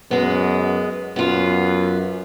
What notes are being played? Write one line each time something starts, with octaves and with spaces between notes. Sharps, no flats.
F#2 G#3 B3
F#2 B3 F4